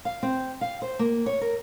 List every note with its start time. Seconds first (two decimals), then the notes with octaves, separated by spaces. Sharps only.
0.05 F5
0.23 C4
0.61 F5
0.82 C5
0.99 A#3
1.26 C#5
1.41 A#4